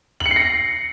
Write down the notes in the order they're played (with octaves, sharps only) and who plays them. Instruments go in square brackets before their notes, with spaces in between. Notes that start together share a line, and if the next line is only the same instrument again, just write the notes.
[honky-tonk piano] F#7
C#7
C7
A#6
C#7